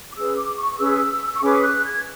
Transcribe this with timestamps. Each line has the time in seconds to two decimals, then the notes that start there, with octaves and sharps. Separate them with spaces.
0.11 D6
0.15 C#4 G#4 B4 E6
0.36 D6
0.57 C#6
0.78 C#4 G#4 B4 E6
1.36 C#6
1.41 C#4 G#4 B4 D6
1.62 F#6
1.84 G#6